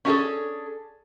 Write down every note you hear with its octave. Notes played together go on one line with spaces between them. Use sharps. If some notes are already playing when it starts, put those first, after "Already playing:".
C#4 D4 E4 F#4 G#4 A4